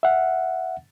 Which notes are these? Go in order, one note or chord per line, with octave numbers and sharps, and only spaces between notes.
E5 F#5